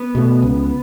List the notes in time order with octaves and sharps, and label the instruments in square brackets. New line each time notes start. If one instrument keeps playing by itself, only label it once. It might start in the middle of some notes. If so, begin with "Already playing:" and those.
Already playing: [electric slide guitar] B3
[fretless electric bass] B2 A3
C#2